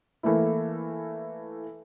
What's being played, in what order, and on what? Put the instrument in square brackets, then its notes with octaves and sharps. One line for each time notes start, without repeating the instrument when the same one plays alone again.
[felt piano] E3 A3 A#3 E4